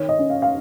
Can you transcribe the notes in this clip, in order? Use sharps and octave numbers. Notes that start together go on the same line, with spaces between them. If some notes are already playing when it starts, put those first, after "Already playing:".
Already playing: D#3 C#5
D#5
C#4
F5
F5